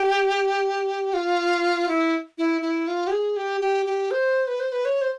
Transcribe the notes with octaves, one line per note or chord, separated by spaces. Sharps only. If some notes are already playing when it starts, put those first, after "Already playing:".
Already playing: G4
F4
E4
E4
E4
F4
G4
G#4
G4
G4
G4
C5
B4
C5
B4
C#5
C5